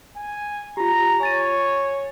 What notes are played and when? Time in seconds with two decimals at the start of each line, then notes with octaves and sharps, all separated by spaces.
0.17 G#5
0.77 F4 G4 A#5
1.21 C#5 G#5 A6 D#7